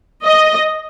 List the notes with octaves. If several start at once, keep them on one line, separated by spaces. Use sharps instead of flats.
D#5